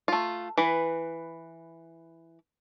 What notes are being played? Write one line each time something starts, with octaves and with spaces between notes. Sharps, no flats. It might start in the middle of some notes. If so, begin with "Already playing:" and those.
A3 F4
E3 B4